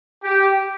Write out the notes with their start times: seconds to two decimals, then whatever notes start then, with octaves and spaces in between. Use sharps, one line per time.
0.24 G4